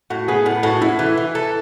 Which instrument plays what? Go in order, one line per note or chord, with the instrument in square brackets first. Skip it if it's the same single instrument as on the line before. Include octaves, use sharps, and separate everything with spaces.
[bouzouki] A2 [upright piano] F#4
[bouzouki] B3 [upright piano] G#4
[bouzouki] A2
[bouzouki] A2 [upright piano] F#4
[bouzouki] A2 [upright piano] E4
[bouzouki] E3
E3
A4